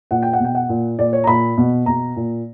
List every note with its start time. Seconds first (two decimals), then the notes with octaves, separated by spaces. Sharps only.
0.11 A#2 F#5
0.22 G5
0.33 F#5
0.40 B2 G5
0.55 F#5
0.69 A#2
0.99 A#2 D5
1.13 C#5
1.24 A#5
1.27 A#2 B5
1.58 B2
1.86 B2 A#5
2.16 A#2